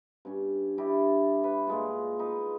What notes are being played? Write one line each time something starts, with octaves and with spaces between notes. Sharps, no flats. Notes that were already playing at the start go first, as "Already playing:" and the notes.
G2 C#4
D4 E4 G4 D#5
B4
A#2 G#3 F4
D#4 F4 B4